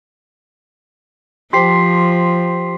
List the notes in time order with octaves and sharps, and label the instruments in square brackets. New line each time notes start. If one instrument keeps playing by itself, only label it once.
[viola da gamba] F3 [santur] G4 C5 A5 [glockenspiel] C6 B6 C7